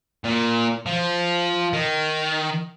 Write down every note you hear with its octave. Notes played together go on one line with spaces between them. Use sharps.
A#2
F3
D#3